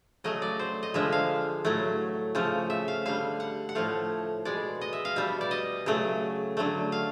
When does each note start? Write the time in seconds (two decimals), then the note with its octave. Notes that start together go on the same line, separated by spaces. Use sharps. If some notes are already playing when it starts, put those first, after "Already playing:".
0.24 C#3 F#3 A3 D#5
0.42 D5
0.60 C5
0.83 D#5
0.94 D3 F3 G#3 E5
1.12 F5
1.65 A2 F#3 A3
2.35 C#3 F3 A3
2.70 E5
2.88 F5
3.05 D3 G3 F5
3.40 F#5
3.69 F#5
3.75 A2 F3 A3 F5
4.45 B2 G#3 D5
4.81 D#5
4.93 E5
5.05 F5
5.16 B2 G3 E5
5.41 D5
5.51 D#5
5.86 C#3 F#3 A3
6.57 D3 F#3 A3
6.92 F5